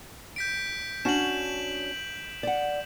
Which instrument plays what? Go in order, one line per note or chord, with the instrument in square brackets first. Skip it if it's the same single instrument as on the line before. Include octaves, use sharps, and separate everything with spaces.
[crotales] G6 B6 D7
[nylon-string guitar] C#4 D4 F#4 [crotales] E7 F#7
[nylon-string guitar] D5 F#5